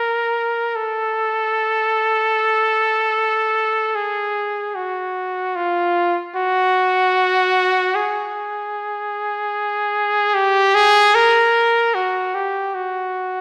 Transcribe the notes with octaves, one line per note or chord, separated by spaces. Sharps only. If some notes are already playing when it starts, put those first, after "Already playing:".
Already playing: A#4
A4
G#4
F#4
F4
F#4
G#4
G4
G#4
A#4
F#4
G4
F#4